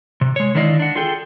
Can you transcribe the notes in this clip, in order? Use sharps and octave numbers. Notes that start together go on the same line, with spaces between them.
C3
G#3 C#5
D3 D#3 E4 D5 D#5 F5
D4 F#5
F4 G#4 A4 G5